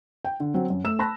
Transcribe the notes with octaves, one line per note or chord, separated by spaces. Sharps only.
G5
D3
F#3 C4
F#2
A3 E6 E7
A5 B5 F#6 A#6